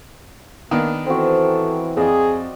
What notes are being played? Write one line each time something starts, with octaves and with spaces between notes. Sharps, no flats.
D#3 A#3 B3 D4
E3 C4 F#4 A4
F2 G#4 D5 D#5